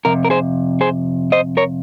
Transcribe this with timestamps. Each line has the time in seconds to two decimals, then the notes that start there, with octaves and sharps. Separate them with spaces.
0.05 F2 C3 A#4
0.25 A#4
0.30 G#4 C5
0.81 G#4 C5
1.32 C5 D#5
1.57 A#4 C#5